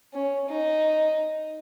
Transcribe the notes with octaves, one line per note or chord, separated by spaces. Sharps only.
C#4
D#4